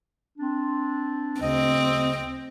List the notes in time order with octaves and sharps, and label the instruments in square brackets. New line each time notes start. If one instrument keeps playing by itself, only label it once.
[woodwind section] C4 D4
[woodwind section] D2 C#3 D#5 [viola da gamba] C4